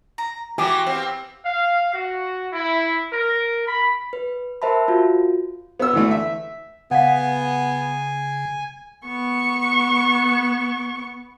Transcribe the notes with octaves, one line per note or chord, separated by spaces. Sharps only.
A#5
E3 B3 F#4 G4 G#5 C6 D6
B3 C4 F5
F5
F#4
E4
A#4
B5
B4
A#4 C5 E5 A5 B5
F4 F#4
B3 E6
D3 E3 A3
E5
C#3 B3 F5 F#5 G#5
B3 C#6